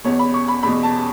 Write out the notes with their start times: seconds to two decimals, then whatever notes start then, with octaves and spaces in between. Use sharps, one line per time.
0.04 E2 B2 C#5
0.19 B5
0.34 C#6
0.48 B5
0.63 E2 B2 B5
0.83 A5